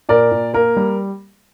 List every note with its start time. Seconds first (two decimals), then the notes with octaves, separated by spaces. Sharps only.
0.09 A#2 A#4 D5
0.31 A#2
0.54 A#3 A#4
0.77 G3